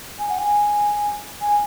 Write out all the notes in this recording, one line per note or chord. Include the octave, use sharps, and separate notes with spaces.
G#5
F#5
G#5
G#5